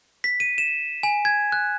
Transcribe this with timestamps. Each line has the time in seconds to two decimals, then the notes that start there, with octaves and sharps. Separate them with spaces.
0.24 B6
0.40 D#7
0.58 E7
1.03 G#5
1.25 G#6
1.52 F#6